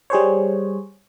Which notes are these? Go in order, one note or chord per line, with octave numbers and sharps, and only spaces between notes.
G3 G#4 C5 C#5